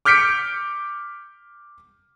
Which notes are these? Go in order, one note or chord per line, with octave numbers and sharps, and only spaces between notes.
D6 F6 G6 B6 C#7 D7